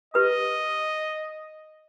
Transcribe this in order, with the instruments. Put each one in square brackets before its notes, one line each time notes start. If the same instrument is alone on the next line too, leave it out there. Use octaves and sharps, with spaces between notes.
[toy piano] G4 B4 D#6 [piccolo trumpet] D#5